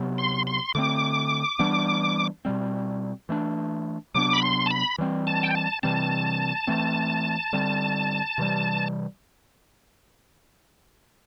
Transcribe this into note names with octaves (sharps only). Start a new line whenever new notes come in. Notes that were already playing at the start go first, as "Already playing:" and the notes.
Already playing: C3 F#3 B3
C6
C6
D3 A3 C4 D6
E3 G3 B3 D4
B2 G3 C4
E3 A3 D4
C3 F#3 B3 D4 D6
B5
C6
A5
B5
E3 G3 C4
A5
G5
A5
C3 E3 G3 C4 A5
E3 A3 C4
D3 G3 C4
C3 E3 G3